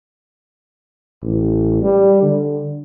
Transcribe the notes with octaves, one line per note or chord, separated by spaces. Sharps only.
A1
G3
D3